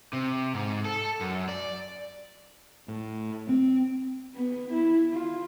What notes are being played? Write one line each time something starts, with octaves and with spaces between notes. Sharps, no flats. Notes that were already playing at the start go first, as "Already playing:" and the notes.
C3
G#2
A4
F#2
D5
A2
C4
B3
E4
F4